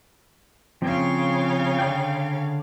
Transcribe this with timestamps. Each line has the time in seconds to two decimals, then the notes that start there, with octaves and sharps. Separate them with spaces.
0.82 C#3 F3 C4 F5
1.79 D3 D5 G5